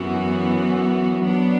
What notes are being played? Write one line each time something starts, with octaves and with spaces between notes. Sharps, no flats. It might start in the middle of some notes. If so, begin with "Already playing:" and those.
Already playing: F#2 E3 B3 F#4
F#3 B3 D4